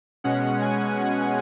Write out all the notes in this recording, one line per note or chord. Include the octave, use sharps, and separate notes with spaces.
B2 G#3 C#4 F#5
G#5
F#5